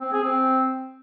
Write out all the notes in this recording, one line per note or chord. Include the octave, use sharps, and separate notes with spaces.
C4
G#4
C4